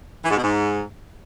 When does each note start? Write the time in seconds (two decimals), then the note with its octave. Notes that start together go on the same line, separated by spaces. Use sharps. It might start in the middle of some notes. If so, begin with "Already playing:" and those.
0.24 E3
0.31 G#2
0.37 B2
0.43 G#2